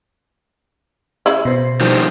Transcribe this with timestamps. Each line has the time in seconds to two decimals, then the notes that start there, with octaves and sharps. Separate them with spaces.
1.26 C#3 E4
1.45 B2 C5
1.81 D#3 F3 G3